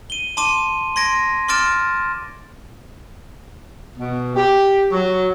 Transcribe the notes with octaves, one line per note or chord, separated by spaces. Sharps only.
D#7 G7
A5 C6 D6 D#7
C6 G#6 A#6 D7
C6 D6 F6 A6 D7 E7
B2
G4
F#3